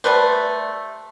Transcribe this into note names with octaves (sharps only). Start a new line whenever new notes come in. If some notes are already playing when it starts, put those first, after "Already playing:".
G3 A3 B4 C5